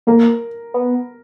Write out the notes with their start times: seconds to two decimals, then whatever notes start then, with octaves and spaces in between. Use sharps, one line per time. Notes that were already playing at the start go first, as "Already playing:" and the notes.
0.07 A#3 A#4
0.74 B3